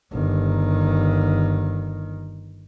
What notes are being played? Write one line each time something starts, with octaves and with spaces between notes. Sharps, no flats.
G1 D#3